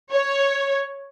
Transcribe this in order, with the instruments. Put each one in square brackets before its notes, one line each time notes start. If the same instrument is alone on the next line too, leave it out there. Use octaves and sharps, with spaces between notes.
[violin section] C#5